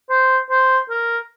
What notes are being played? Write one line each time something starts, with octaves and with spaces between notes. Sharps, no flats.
C5
C5
A#4